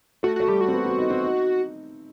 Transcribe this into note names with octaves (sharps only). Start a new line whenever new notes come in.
A3 F#4
A3 F#4
G3 G4
F#4
C4
B3
C4
D#4
C4
D#4